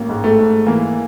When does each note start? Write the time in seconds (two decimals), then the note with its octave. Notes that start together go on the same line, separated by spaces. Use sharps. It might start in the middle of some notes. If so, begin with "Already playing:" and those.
Already playing: A1 A#3
0.09 G#2
0.24 A3
0.38 G#2
0.66 E3 A#3